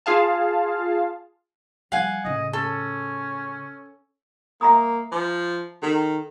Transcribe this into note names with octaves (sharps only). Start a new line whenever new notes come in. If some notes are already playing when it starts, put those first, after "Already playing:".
F4 G#4 F5 A5
F3 G3 F5 F#5 G#5
A2 C#3 D#5
C#4 A4
A#3 E5 A#5 D#6
F3
D#3 A4